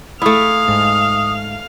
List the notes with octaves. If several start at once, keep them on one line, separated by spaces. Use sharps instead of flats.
A3 E4 F5 D#6
G#2